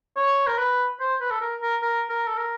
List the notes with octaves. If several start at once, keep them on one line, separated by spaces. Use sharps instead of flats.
C#5
A#4
B4
C5
B4
A4
A#4
A#4
A#4
A#4
A4
A#4